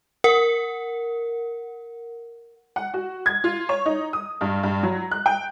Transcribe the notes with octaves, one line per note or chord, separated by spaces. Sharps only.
A#4 F#5
F#5
F#4
G#6
F4
C#5
D#4
D#6
G2
G2
F#3
F#6
G5